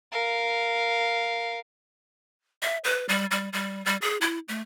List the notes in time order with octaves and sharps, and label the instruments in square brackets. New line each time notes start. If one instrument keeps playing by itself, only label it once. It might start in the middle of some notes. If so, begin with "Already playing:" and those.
[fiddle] A#4 F5
[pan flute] E5
B4
G3
G3
G3
G3
G#4
E4
A3